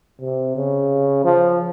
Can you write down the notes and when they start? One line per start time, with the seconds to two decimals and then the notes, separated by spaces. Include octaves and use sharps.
0.21 C3
0.56 C#3
1.24 F3